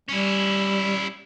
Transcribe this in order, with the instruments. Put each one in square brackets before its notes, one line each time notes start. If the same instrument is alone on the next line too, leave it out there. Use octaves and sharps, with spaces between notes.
[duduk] G3 [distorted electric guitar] C#4 E4